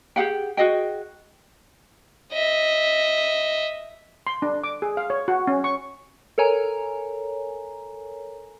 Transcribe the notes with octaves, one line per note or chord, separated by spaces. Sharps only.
G4 G#4 F#5 G5
F#4 G#4 D#5 G5
D#5 E5
C6
D4
D6
G#4
F5
C#5
F#4
C#4
C#6
A4 A#4 C#5 G#5 A#5